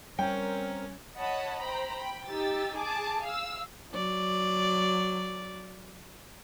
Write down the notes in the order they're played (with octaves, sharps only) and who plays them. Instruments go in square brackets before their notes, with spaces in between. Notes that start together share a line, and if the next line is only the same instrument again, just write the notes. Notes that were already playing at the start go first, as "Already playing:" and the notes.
[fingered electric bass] G3 [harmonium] C4 A#4 C#5 [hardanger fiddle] C#4 [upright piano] G5
[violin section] C#5 D#5 F#5 A5 B5
C5 G5 A#5 B5
G5 B5
D#4 G4 E6 A6
G#4 A5 D6
F5 E6
[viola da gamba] F#3 D5